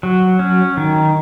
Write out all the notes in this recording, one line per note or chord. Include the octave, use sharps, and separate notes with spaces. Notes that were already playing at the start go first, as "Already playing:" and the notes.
F#3
C#4
D#3